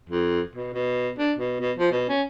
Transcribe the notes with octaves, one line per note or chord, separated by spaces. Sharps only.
F2
B2
B2
D4
B2
B2
F3
B2
C#4